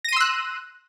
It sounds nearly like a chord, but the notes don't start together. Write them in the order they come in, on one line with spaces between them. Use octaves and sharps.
A#6 D#7 C6 E6 F#6